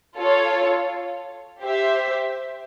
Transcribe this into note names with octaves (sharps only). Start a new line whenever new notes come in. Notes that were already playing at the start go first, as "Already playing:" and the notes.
F4 A4 C#5
G4 C5 E5